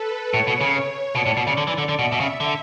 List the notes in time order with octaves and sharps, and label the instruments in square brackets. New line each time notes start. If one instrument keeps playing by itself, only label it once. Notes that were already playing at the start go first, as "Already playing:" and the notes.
Already playing: [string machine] A4 B4
[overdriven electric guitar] A2 [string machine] C#5
[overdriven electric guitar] B2
C#3
[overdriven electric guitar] B2 [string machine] D5
[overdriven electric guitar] A2
B2
C#3
D3
E3
D3
D3
[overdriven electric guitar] B2 [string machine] E5
[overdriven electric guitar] B2
C#3
D3